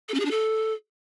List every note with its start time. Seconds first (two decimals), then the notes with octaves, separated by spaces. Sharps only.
0.09 A4
0.14 C#4
0.20 G#4
0.25 D4
0.31 A4